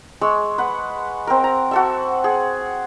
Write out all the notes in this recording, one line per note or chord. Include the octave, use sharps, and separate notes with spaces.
G#3 C#6 E6
B4 F#5
C4 A#4
A#5
F#4 A4 E5
G#4